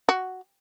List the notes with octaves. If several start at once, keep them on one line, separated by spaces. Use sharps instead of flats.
F#4